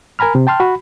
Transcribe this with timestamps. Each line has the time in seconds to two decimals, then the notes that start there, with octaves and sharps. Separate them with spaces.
0.19 A#4 G#5 A#5 B5 F6
0.35 C3
0.47 G5 A5 C6 F6
0.60 F#4 B5